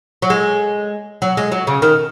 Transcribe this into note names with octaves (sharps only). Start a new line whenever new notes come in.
F#3
G#3
F#3
G#3
F#3
C#3
D#3